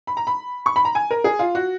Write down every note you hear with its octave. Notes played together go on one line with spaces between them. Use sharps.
B5
A#5
B5
C#6
B5
A#5
G#5
A#4
G#4
F4
F#4